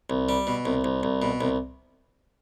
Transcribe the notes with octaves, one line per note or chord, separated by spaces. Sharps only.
C2
G3
B2
C2
C2
C2
B2
C2